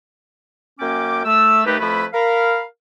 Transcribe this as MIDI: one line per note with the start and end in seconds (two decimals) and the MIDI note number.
0.79 1.22 42
0.79 1.22 58
0.79 1.22 61
0.79 1.22 79
0.79 1.22 86
1.25 1.66 57
1.25 1.66 88
1.66 1.77 39
1.66 1.77 57
1.66 1.77 63
1.66 1.77 67
1.66 1.77 71
1.80 2.06 41
1.80 2.06 53
1.80 2.06 57
1.80 2.06 64
1.80 2.06 71
1.80 2.06 83
2.14 2.63 70
2.14 2.63 77
2.14 2.63 83